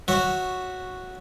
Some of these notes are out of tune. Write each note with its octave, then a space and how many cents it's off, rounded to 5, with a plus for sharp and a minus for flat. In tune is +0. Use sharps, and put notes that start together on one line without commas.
F#4 -5 C#5 +0 E5 -15